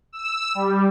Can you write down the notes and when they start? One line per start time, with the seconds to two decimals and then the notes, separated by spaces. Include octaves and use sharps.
0.13 E6
0.55 G3